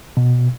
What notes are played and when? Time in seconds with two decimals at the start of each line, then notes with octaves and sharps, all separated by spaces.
0.17 B2